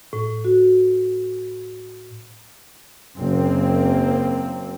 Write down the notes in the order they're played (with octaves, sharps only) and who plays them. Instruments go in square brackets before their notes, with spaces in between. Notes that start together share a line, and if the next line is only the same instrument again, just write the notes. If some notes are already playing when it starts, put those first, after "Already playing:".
[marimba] A2
F#4
[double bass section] F#1 A#3 C4